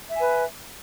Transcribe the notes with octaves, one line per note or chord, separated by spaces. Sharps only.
B4 E5 G#5